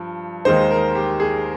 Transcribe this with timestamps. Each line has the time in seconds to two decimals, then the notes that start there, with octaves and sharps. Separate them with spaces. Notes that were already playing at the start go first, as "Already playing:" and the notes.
Already playing: G2 F3
0.45 D#2 D#3 G#3 D#4 C5
0.71 A#4
0.95 G4
1.20 G#4